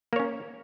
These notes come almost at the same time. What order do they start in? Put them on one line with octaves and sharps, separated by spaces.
A#3 C#5 C#4